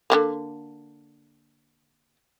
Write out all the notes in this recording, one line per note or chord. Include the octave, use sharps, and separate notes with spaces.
D3 G#3 A#3